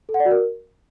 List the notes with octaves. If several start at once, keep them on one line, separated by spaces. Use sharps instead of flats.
A4
F#5
D5
F#4
A#4